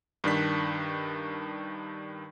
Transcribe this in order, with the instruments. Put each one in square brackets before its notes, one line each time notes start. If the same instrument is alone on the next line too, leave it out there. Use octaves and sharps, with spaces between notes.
[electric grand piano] G2 D#3 D4 B6